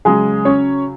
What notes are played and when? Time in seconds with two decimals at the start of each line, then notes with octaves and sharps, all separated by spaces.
0.05 C#3 F#3 G#3 G#4
0.45 C#4 C#5